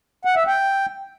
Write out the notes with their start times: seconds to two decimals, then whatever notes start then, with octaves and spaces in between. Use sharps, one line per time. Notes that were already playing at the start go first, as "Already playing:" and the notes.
0.25 F#5
0.36 E5
0.47 G5